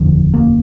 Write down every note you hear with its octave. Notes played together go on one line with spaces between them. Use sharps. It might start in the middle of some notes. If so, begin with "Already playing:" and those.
Already playing: F1 D#2 D3 F3
A#3